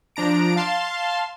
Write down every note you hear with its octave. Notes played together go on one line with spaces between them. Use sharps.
F3 D4 A#5 D7
F5 A5 C6